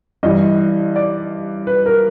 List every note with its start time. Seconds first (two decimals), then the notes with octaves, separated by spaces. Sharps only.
0.23 G2 E3 D#5
0.96 D5
1.67 B4
1.86 A#4